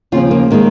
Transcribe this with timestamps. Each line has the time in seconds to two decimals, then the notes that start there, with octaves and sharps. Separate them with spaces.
0.12 D#2 C#3 F3 F4
0.31 A#3
0.51 D#3 G#3 A#3